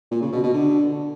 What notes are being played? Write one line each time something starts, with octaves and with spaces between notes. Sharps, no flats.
A#2
C#3
B2
B2
D3